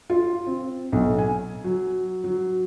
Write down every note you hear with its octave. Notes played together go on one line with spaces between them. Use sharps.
F4
C4
B1
G#5
F#3
F#3